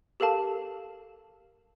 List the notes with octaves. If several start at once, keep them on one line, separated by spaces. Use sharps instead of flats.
G4 A4 A#4 F5 A5